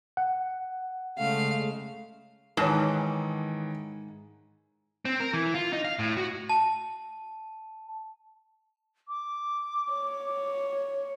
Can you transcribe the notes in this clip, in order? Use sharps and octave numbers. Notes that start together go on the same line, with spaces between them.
F#5
C#3 G#3 A3 F5
G#2 D#3 E3 C#5 A5
C4
A#4
E3
F4
D#4
F5
A2
F#4
A5
D6
C#5